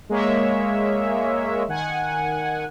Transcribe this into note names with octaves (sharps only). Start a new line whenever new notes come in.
G#3 A#3 C#5 E5
D#3 F#5 G#5